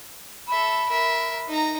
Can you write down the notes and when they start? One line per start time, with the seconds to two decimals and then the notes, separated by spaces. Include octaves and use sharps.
0.48 A4 E5 B5
0.89 A#4 E5
1.48 D#4 A#5